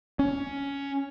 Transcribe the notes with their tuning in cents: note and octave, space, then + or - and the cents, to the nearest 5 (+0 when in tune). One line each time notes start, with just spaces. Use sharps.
C#4 +10